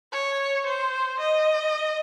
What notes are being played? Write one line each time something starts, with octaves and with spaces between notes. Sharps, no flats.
C#5
C5
D#5